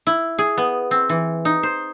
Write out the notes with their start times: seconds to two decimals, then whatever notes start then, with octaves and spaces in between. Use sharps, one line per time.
0.07 E4
0.38 G#4
0.58 B3
0.91 C4
1.09 E3
1.45 D#4
1.63 C5